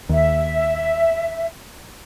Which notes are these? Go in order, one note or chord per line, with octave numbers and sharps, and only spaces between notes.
D#2 E5